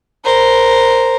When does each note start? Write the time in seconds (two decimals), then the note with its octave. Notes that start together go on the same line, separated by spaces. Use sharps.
0.24 A#4 C5